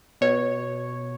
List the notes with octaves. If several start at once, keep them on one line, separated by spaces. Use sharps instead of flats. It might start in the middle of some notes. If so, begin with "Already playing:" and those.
B2 C#5